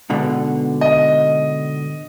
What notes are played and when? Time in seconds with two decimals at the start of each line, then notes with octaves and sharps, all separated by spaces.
0.10 G#2 B2 D3
0.81 D#5